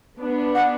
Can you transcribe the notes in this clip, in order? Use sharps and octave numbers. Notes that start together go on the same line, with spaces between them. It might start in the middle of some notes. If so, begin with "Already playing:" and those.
B3 D4
F#5